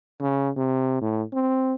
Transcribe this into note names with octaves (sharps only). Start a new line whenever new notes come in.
C#3
C3
A2
C4